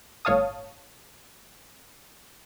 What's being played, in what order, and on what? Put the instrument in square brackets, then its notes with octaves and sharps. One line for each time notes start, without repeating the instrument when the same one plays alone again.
[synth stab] G1 A2 C#5 F5 A5 D#6